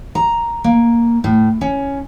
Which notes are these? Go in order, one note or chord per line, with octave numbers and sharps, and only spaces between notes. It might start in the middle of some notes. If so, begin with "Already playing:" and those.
A#5
A#3
A2
C#4